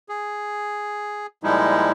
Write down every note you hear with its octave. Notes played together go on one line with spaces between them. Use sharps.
G#4
A#2 F3 G3 G#3 D#4 E4